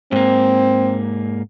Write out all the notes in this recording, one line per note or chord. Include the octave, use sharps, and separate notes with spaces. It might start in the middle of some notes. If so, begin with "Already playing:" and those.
G#2 A#3 C4